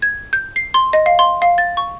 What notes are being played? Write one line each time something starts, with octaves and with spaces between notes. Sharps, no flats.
G#6
G6
C7
C6
D#5
F5
C6
F5
A6
C#6